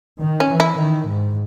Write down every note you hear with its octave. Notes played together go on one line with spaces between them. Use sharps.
D#3
C#4
E3
E4
D#3
G#2